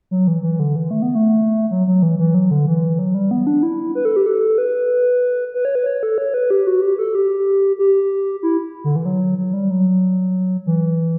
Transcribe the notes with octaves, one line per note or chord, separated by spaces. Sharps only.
F#3
E3
E3
D3
E3
A3
B3
A3
F#3
F#3
E3
E3
F#3
D3
E3
F#3
G3
B3
D4
E4
B4
A4
G4
A4
B4
B4
C#5
B4
C#5
A4
C#5
B4
G4
F#4
G4
A4
G4
G4
E4
D3
E3
F#3
F#3
G3
F#3
E3